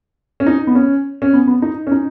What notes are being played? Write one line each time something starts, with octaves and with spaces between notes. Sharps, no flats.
C#4
D#4
B3
C#4
C#4
B3
B3
D#4
C#4
D#4